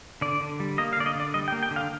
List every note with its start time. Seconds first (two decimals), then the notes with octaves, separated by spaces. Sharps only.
0.21 D3 D5
0.41 D3
0.60 G3
0.78 A#3 D#5
0.93 F5
0.97 D3 D5
1.06 D#5
1.15 D3 D5
1.34 G3 D#5
1.48 G5
1.52 A#3
1.63 G5
1.71 D3
1.76 F5